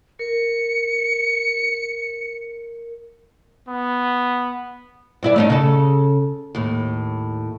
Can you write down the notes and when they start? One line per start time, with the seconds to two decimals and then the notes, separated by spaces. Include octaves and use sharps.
0.19 A#4 C#7
3.68 B3
5.23 G2 E4 D5
5.36 A3 C#4 D#4
5.50 C#3 A4
6.55 D#2 A2